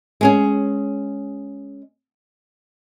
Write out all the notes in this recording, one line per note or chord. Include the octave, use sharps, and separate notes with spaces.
G#3 C#4 G#4